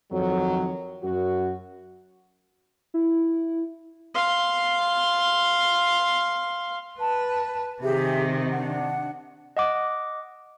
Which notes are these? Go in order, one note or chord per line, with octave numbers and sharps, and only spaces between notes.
F2 D#3 F#3
F#2 F#4
E4
F5 C6
B4 A5
C3 D#3 G4 G#4 E5
D4 F#5
D#5 F#5 D6